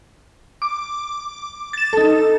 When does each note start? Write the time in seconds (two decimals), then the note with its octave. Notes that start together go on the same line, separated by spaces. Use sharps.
0.62 D6
1.73 A6 E7
1.93 D#4 A4